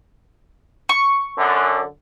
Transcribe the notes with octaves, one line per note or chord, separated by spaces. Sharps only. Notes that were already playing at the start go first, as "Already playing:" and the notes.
C#6
F#2 D3